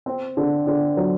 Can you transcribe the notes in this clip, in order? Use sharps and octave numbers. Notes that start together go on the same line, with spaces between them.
C4
D3
D3
F#3